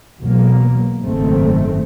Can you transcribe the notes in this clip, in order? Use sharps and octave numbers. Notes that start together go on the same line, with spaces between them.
B1 E2 B2 F#3 A#3
F#1 G#2 D#3 A3 C4